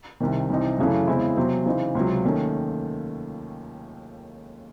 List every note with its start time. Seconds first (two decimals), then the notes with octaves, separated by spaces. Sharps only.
0.20 C2 C3 D#3
0.50 C2 C3 E3 C4 D#4
0.79 F#2 C#3 E3 A3 C#4
1.07 E2 C#3 G#3 C4 E4
1.37 E2 C3 F#3 C4
1.66 C#3 E3 C4 D#4
1.95 C#2 C3 F#3
2.24 D#2 D#3 A3 C#4